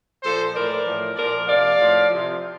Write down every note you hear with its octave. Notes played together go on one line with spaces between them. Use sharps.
A#2 F3 A4 C5
A2 E3 A#4 D5
A2 F3
A#2 F3 A#4 D5
C3 F3 D5 F5
A2 F3
C3 F3